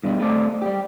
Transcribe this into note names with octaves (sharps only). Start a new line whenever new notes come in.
G2 B2 G3
A3 C4 A4 D5
G3 G4